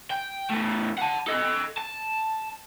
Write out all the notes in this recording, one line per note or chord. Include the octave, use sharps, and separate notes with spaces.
G5
E2 A3
F#5 A5
A4 D#5
A5